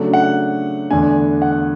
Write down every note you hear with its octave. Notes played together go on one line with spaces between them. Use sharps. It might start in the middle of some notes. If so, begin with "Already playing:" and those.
Already playing: C#3 F#3 A3 D4
F#5
E2 D3 A3 D4 G#5
F#5